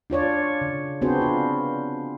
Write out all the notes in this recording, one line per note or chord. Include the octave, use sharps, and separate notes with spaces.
D4 F4 C#5 D5
C#3
B3 C4 D4 F#4 G#4 C5
F4